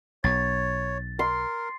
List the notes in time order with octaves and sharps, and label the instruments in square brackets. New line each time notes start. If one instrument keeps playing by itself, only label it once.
[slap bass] B1 B2 [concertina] C#5 [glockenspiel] A6
[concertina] A#4 [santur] C6